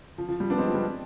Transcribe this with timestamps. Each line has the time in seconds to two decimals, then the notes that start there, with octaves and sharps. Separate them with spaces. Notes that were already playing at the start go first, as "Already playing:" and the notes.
0.18 F3
0.29 F3
0.40 G3
0.50 B3 D4
0.58 G#3 C4
0.67 F3
0.74 G3